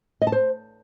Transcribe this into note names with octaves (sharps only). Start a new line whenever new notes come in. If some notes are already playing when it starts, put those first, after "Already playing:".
D#5
A5
C5